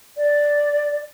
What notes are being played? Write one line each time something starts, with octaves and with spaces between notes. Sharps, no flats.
D5